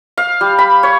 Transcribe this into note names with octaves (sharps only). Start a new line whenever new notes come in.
F5
G3
B5
C#5